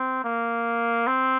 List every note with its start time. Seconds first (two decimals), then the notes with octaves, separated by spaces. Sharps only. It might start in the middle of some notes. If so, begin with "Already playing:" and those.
Already playing: C4
0.24 A#3
1.07 C4